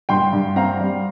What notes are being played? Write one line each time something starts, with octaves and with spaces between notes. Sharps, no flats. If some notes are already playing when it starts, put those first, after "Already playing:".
G2 G5 C6
G2
C4 F5 A#5
G3